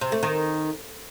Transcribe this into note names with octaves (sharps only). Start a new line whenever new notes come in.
C3
A3
D#3